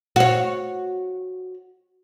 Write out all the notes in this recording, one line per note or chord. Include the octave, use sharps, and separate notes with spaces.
F#4 C#5